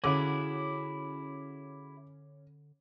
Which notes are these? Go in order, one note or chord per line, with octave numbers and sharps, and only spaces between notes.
D3 C#4 E4 F#4 G#4 D6